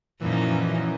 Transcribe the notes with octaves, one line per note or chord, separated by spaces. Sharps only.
F#2 A#2 E3 F3 D#4